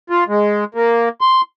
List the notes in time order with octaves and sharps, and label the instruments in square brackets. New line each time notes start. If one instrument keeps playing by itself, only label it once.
[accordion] F4
G#3
A#3
C6